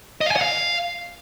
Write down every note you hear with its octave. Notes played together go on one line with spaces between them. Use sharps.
D#5
F5
G#5
F#5
F5